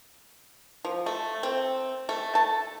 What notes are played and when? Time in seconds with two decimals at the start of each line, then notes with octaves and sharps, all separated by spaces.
0.85 F3
1.06 A3
1.43 C4
2.09 A3
2.35 A5